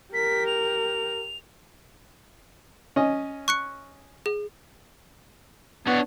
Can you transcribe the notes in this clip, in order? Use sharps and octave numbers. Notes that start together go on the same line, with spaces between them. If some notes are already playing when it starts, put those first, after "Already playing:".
G4 A#4 B6
F7
C#4 D#5
C#6 F#6 C#7
G#4
B3 D4 C#5